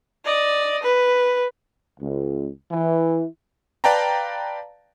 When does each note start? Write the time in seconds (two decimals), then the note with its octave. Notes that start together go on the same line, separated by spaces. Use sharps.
0.24 D5 D#5
0.82 B4
2.00 C#2
2.72 E3
3.84 B4 D5 F5 G5 A5 A#5